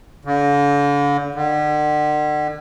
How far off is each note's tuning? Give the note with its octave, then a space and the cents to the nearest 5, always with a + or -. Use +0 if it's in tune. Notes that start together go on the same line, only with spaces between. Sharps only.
D3 -40
D3 +40